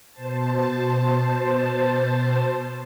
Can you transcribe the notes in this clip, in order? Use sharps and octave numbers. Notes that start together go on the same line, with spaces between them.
B2 C5 A5